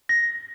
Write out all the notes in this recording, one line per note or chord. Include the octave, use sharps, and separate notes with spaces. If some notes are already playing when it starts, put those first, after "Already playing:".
A#6